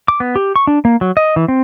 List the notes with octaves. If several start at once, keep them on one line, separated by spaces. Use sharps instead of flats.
D6
B3
G4
C#6
D4
A#3
F#3
D#5
E3
C4